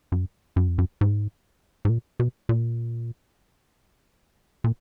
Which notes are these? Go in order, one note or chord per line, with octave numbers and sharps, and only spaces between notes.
F#2
F#2
F2
F#2
G#2
G#2
A#2
B2
A#2
A#2